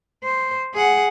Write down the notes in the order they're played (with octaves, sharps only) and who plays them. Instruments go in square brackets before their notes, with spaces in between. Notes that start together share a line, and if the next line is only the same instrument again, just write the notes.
[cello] C5
G#4 F#5